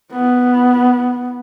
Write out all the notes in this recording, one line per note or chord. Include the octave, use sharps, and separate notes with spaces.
B3